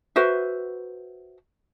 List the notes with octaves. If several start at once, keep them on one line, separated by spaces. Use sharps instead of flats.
F#4 B4 C5 E5